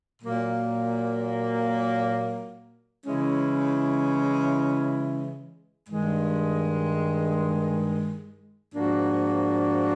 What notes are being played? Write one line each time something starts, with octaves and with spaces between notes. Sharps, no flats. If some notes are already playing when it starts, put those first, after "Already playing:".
A#2 F#3 A#3
C#3 E3 G#3 C#4 E4
G2 D#3 G#3
G#2 F3 A#3 D4 F#4